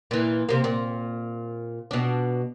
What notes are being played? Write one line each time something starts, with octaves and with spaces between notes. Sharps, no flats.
A#2 E3
C3 A#3
A#2
B2 D4